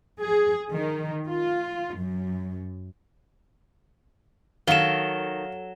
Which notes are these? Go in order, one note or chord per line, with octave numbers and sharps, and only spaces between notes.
G#4
D#3
F4
F#2
D#3 F#3 A4 F5 E7 G7